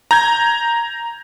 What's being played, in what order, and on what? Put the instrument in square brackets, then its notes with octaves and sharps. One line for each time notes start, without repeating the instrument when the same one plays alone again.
[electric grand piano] A#5 G6 G#6